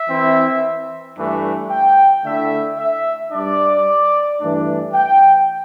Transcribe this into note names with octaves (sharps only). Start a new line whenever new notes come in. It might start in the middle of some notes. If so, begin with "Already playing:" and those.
Already playing: E5
E3 C4 E4
G2 E3 A3 D4
G5
D3 A3 E4 E5
E5
G2 G3 D4 D5
G2 E3 A3 D4
G5